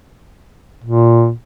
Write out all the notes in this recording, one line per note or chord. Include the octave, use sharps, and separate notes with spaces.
A#2